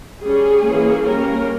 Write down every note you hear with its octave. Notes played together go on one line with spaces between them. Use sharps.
G3 C#4 G#4
E3 A#3 C#4
G3 A#3 C#4 A#4